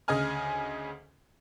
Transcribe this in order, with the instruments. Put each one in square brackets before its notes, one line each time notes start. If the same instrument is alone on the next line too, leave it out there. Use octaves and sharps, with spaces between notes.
[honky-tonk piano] D2 C#3 G#4 D#5 G#5 F6